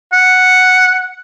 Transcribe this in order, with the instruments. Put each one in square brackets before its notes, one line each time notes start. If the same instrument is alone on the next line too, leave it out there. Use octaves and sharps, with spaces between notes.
[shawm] F#5